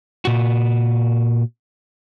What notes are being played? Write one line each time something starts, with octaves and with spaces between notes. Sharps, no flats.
A#2 F#4